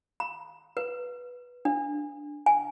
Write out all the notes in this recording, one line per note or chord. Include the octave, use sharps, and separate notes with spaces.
B5
B4
D4
G#5